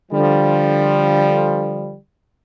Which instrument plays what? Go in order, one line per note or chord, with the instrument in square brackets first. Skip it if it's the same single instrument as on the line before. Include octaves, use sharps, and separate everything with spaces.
[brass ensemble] D3 F3 G3